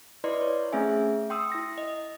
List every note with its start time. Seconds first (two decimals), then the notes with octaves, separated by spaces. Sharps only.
0.24 E4 B4 D5 D#5 C6
0.41 C#5
0.72 A3 C4 C#4 G#4 E5 G#5
1.30 G5 C6 D#6 E6
1.52 E4 A#6
1.78 D#5